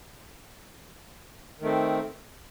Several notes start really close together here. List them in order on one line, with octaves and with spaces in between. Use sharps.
D#3 A3 C4